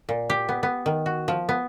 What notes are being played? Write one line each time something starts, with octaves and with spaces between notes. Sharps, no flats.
A#2
G4
B3
B3
D#3
F#4
F3
B3